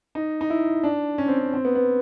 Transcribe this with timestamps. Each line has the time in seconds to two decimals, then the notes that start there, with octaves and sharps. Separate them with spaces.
0.15 D#4
0.41 D#4
0.50 E4
0.83 D4
1.18 C#4
1.28 C4
1.39 C#4
1.54 C4
1.65 B3
1.75 B3